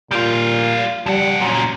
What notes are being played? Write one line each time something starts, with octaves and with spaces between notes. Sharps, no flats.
A#2 G3 F4
F2 G3 F#5
F#2 A#2 F#3